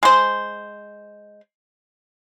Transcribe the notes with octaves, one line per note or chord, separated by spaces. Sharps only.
G#3 C5